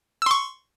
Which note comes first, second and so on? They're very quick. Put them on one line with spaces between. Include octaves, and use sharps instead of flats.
E6 C6 C#6